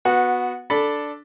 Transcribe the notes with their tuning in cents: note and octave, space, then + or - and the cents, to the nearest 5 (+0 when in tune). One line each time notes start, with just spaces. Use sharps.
B3 +0 F#4 -15
D4 +0 A4 +0 B5 +0